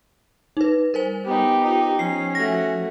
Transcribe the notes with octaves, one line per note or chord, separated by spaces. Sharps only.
D#4 B4
G3 A#4 C5 G#5
B3 D#4 G4
D#4 F4
F3 C#4 C7
A3 F#4 A#6